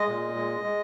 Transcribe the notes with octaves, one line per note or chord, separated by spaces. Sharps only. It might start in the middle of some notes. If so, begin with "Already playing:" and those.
Already playing: G#3 D#5
A#2
G#3
G#3